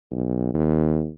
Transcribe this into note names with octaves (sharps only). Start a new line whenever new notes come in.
B1
D#2